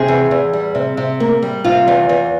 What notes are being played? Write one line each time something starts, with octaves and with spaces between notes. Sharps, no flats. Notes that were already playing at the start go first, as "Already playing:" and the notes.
Already playing: C3 G#4
E2
E2
G3
C3
C3
A#3
G3
C3 F4
E2
E2